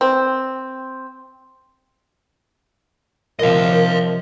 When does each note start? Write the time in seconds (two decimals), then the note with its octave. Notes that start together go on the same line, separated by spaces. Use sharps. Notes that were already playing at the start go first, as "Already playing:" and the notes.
0.01 C4
3.39 C3 F3 A#4 D#5 F5